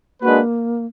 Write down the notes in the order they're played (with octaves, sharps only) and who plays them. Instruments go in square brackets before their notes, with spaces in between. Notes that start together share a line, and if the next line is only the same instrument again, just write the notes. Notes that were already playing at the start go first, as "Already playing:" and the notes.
[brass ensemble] G#3 D4 F#4 B4 [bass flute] A#3